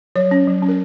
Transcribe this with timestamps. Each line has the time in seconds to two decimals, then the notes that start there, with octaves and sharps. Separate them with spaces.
0.16 F#3 C#5
0.31 C#4
0.47 F#3
0.62 C#4
0.69 A#4